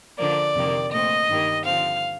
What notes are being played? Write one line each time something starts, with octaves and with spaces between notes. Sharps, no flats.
D3 F3 A#3 D5
F2 C3 D#3 A#3
A#2 A3 C4 D#5
G2 D#3 G3 A#3
D3 F3 C4 F5